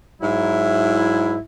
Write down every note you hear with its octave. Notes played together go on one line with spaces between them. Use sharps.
G#2 F#3 E4